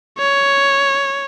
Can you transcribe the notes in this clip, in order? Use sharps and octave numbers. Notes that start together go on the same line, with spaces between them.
C#5